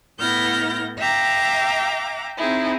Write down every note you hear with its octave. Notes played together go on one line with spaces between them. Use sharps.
A2 B3 E4 F6 G6 A#6
E5 F5 G5 A#5 D6
C4 D#4 E4 G#4